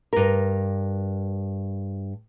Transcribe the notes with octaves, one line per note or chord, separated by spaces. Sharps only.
G2 A#4